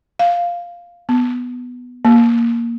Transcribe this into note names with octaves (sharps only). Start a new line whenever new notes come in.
F5
B3
A#3